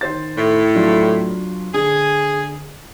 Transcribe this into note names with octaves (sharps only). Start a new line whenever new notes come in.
D#3 C5 A6
A2
F#3 D4 F4
D3 G#4